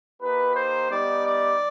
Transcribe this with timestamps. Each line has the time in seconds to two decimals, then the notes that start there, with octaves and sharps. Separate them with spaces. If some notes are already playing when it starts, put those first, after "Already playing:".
0.21 A#3 D#4 G4 B4
0.55 C5
0.89 G3 B3 D#4 G4 D5
1.24 D5